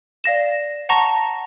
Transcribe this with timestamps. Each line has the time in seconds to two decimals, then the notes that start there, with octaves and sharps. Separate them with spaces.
0.24 D5 F5 A#6 E7
0.89 F#5 A5 A#5 C#6 A#6